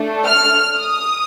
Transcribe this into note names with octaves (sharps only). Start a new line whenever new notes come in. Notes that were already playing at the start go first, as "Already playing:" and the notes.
Already playing: A3 D4 A4
F6
D#6